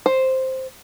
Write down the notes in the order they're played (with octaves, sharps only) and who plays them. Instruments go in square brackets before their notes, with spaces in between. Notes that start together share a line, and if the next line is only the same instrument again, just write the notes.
[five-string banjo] C5